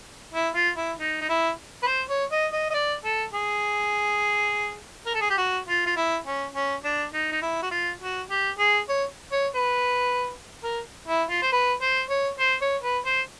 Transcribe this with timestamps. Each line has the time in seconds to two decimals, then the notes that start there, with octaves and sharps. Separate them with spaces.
0.33 E4
0.55 F4
0.77 E4
0.99 D#4
1.21 D#4
1.29 E4
1.83 B4
1.86 C5
2.09 C#5
2.31 D#5
2.52 D#5
2.70 D#5
2.74 D5
3.04 A4
3.34 G#4
5.06 A#4
5.14 A4
5.21 G#4
5.30 G4
5.38 F#4
5.67 F4
5.86 F4
5.96 E4
6.26 C#4
6.54 C#4
6.84 D4
7.14 D#4
7.32 D#4
7.42 E4
7.62 F#4
7.71 F4
8.01 F#4
8.30 G4
8.59 G#4
8.89 C#5
9.32 C#5
9.55 B4
10.64 A#4
11.08 E4
11.30 F4
11.42 C5
11.52 B4
11.82 C5
12.10 C#5
12.39 C5
12.61 C#5
12.83 B4
13.06 C5